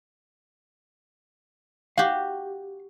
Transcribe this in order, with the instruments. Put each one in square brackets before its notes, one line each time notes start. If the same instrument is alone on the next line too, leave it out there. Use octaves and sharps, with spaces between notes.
[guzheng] F#4 G4 [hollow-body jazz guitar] F5